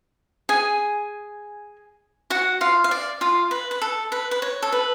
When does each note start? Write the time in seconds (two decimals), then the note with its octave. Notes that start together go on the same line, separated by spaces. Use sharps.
0.49 G#4 G#5
2.30 F#4 F#5
2.61 F4 F5
2.84 F5
2.91 D5
3.21 F4 F5
3.51 B4
3.71 B4
3.82 A4
4.12 B4
4.31 B4
4.42 C#5
4.62 A4
4.72 B4